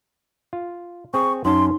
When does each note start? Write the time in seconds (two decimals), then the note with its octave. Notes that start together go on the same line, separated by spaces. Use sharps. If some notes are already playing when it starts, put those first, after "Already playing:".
0.53 F4
1.14 C4 G#4 C#6
1.45 F#2 C#4 D#4 A5 C6